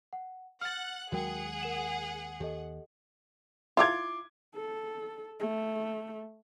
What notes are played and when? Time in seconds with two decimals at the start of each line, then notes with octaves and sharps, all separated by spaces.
0.13 F#5
0.61 F#5 F6 F#6 A6
1.12 D#2 F#3 G#3 F#4 G#4 A#4 F#5 G5
1.61 A#4 E7 F#7
2.40 D#2 G4 A4 D#5
3.77 E4 F4 A#5 C6 D6 G#6
4.55 A4
5.40 A3